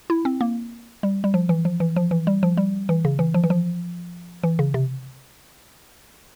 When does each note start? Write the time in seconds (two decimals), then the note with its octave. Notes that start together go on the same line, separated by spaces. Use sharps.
0.10 E4
0.25 C4
0.41 A#3
1.03 G3
1.24 G3
1.34 F3
1.49 E3
1.65 F3
1.80 E3
1.96 F3
2.11 E3
2.27 G3
2.43 F3
2.57 G3
2.89 E3
3.05 C#3
3.19 E3
3.34 F3
3.44 E3
3.50 F3
4.43 E3
4.59 C#3
4.74 C3